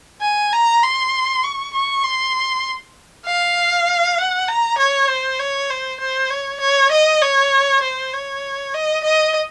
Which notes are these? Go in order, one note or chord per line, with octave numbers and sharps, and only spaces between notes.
G#5
A#5
C6
C#6
C#6
C6
F5
F#5
A#5
C#5
C5
C#5
C5
C5
C#5
C#5
D#5
C#5
C5
C#5
D#5
D#5